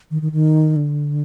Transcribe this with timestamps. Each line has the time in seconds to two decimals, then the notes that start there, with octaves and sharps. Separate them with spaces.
0.11 D#3
0.22 D#3
0.32 D#3
0.76 D3